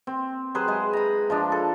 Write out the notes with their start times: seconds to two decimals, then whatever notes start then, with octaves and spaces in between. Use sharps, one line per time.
0.07 C4
0.55 F#3 G#4 B4 C5
0.68 G#3 G#4
0.93 A#5 B5
1.30 F3 G#3 D4
1.52 A4